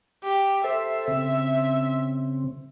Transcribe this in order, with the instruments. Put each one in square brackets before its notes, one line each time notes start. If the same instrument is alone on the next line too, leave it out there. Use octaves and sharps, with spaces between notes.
[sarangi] G4
[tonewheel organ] A4 C5 [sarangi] E5
[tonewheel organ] C#3 C4